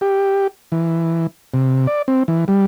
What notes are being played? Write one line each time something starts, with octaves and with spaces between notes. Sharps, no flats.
G4
E3
C3
D5
C4
E3
G3